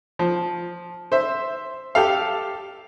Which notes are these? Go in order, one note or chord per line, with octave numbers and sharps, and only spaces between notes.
F3
C5 E5
G4 A4 F5